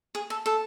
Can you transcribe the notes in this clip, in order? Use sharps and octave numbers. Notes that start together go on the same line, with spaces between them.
G#4
A4
A4